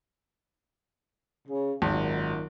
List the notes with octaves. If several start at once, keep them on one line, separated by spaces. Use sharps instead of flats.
C#3
G#1 F#2 A#2 D#3